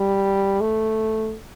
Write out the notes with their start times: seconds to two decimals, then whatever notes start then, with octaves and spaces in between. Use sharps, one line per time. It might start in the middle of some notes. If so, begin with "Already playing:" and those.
Already playing: G3
0.60 A3